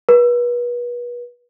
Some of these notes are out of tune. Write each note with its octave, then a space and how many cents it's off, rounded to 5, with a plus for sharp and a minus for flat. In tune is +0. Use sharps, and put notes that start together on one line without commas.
B4 -35